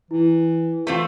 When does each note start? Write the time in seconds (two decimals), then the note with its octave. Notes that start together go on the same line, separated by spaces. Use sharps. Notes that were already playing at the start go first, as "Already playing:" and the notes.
0.11 E3 E4
0.87 E3 A3 C4 F4